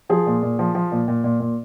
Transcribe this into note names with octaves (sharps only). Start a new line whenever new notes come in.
F3 G#4
A#2
A#2
F3
F3
A#2
A#2
A#2
A#2